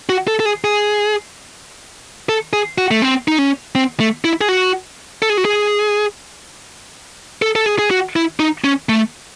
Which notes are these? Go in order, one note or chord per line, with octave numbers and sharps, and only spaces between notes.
F#4
A4
A4
G#4
G#4
A4
G#4
F#4
A3
C4
D#4
C#4
C4
A3
E4
G#4
F#4
A4
G#4
F#4
G#4
A4
A4
G#4
G#4
F#4
E4
D#4
C#4
A3